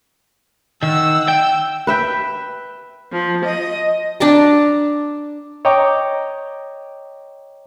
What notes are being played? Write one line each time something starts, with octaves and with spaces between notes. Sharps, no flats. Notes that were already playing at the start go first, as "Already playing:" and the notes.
D#3 F#5 E6
G5 E6
B4 E5 G5
F3
D#5
D4 D5 A5 A#5
C#5 D#5 G5 A#5 D6